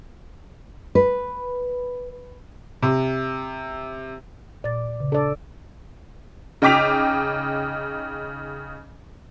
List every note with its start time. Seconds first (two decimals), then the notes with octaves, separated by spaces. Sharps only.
0.95 B4
2.82 C3
4.64 A#2 D5 A6
5.00 C#3
5.12 D4 A4 D5
6.62 C#3 D#4 G5 D6 B6 F7